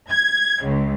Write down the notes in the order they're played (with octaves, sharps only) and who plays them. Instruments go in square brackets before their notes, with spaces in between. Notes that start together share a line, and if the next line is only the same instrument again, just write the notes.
[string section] G#6
C#2